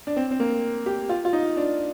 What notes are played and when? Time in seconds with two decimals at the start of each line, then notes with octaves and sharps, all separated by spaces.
0.07 D4
0.17 C4
0.31 C4
0.40 A#3
0.86 G4
1.09 F4
1.25 F4
1.33 D#4
1.57 D4